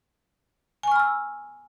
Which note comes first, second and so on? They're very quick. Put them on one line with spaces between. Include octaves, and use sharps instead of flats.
G#5 C#6 F6 B5 E6